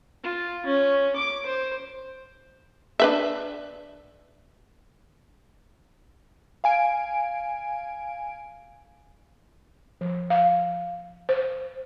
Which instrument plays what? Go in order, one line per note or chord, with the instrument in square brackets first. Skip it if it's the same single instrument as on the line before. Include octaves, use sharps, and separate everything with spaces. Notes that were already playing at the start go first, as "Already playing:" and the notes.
[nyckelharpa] F4
C#4
D6
C5
[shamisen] D4 B4 E5
[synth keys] F5 G#5 D7
[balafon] F3
F5
C5